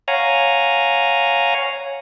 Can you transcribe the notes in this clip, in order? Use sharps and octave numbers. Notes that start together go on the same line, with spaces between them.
C#5 F5 F#5 G#5 A#5